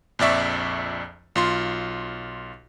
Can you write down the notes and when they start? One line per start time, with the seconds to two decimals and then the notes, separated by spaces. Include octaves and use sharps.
0.19 A#1 F2 D5 E5 C#6
1.35 B1 F4 C6